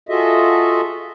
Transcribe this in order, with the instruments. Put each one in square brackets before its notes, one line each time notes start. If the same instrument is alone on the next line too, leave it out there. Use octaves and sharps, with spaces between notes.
[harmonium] F4 F#4 G#4 A4 D#5 E5